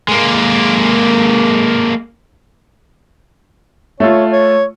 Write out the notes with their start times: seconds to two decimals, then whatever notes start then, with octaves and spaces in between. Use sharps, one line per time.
0.09 G#3 A#3
4.00 A3 F4 C#5
4.32 C#5